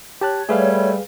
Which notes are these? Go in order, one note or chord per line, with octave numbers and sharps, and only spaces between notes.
G4 C#5 A5 F#6
G3 A3 G#4 B4 F5